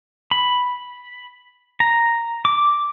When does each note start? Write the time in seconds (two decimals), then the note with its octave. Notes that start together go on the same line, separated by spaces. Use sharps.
0.31 B5
1.80 A#5
2.45 D6